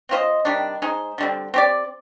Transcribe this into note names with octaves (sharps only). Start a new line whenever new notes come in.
C4 F4 C5 D#5
C3 D#3 G3 D4
G#3 D#4 G#4 C5
D3 G3 C4
C4 G4 D5